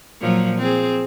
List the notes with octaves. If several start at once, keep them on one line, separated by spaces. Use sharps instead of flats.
A#2 F3 F#3
C4 G#4